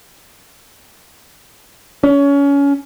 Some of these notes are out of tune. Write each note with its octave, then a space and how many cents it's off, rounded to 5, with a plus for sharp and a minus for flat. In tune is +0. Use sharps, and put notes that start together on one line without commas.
C#4 +25